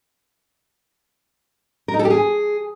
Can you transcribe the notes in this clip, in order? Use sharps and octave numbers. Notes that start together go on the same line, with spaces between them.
A#4
D#4
A4
G4
G#4